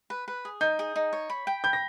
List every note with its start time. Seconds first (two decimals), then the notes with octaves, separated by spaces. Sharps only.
0.10 B4
0.28 B4
0.45 G#4
0.61 D#4 G6
0.79 G#4
0.96 D#4
1.13 C#5
1.30 B5
1.47 G5
1.64 B5 G6
1.73 A#6